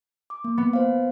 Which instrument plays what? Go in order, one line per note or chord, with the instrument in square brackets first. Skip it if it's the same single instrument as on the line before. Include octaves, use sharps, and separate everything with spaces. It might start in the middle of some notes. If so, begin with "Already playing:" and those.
[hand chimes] D6
A#3
[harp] B3
[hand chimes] C5 F5